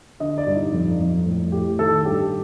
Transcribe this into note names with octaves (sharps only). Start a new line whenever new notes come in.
D3 D#5
D5
G2
D#4
F2
F2
A2
A2 G4
D#3 A4
G2 G4